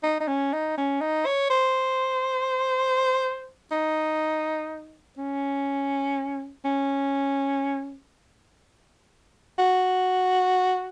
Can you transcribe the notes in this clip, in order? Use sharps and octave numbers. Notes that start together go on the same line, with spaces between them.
D#4
D#4
C#4
D#4
C#4
D#4
C#5
C5
D#4
C#4
C#4
F#4